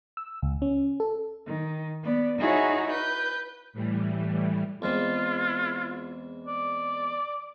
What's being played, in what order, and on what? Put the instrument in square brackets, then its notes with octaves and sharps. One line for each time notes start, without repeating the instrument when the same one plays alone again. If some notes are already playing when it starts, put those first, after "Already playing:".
[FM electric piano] E6
C#2
C#4
A4
[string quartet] D#3
B3 D5
D#4 E4 F#4 G#4 C#5
B4 G6
[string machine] A2 E3 G3
[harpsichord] E2 G#3 C4 [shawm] F4
[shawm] D5